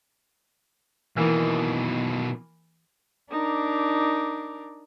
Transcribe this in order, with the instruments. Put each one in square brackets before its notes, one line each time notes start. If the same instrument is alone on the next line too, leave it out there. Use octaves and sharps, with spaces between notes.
[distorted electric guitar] B2 D#3 [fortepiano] E3 A#3
[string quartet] D4 D#4 A#4 D6